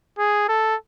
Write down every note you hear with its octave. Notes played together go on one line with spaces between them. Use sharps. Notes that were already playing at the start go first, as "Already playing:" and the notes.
G#4
A4